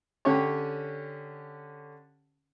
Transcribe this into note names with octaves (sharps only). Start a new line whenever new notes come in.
D3 C#4 G4 C#5